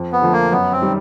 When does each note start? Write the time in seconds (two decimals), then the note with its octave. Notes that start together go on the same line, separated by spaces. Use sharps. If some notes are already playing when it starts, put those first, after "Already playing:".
Already playing: F2
0.12 B3
0.22 D3 F3 A3
0.32 A#3
0.52 F#2 B3
0.72 C4
0.82 D#3 G3